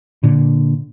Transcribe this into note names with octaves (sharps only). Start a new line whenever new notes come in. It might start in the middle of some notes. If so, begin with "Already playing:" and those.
A#2 D3